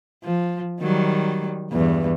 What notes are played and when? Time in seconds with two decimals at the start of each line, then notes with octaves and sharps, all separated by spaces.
0.24 F3
0.80 D#3 F#3 G3
1.72 E2 G2